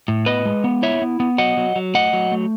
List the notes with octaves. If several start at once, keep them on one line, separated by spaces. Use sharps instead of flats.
A2
B3 B4 D#5
G#3
B3
E4 C#5 E5
B3
B3
F#3 D#5 F#5
F#3
F#3
A3 D#5 F#5
F#3
A3